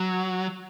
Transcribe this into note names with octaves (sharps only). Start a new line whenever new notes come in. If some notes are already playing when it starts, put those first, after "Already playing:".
Already playing: F#3